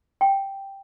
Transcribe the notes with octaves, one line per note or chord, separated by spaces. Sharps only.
G5